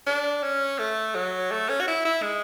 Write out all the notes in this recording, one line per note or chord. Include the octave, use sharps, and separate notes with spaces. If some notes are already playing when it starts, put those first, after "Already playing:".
D4
C#4
A3
F#3
A3
C#4
F#4
E4
E4
G#3